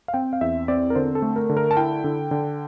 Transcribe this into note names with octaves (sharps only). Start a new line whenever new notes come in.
F5
C4 G5
F5
E2 E5
C4 D5
A#4
D3 C5
A4
A3
A#4
D3
A#4
A5
E4 G5
D3
D3